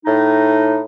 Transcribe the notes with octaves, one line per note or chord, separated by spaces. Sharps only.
A2 D#4